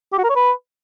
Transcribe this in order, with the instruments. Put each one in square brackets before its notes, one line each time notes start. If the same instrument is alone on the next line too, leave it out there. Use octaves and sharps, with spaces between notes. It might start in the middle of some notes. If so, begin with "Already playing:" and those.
[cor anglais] G4
F#4
A#4
C#5
B4